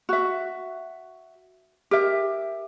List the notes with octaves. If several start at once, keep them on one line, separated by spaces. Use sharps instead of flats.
F#4 E5
G4 A#4 E5